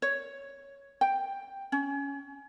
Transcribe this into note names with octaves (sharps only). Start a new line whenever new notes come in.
C#5
G5
C#4